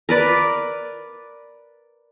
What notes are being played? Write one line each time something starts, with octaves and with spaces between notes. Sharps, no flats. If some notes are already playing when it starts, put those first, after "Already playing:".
A#4 B4 D5